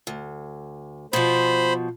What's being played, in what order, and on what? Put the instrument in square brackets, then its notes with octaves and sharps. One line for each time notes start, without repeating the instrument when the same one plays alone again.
[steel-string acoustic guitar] D2
[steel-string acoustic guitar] B2 F3 [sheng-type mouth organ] C5 B5